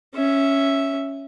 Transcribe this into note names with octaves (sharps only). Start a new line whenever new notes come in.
C#4 E5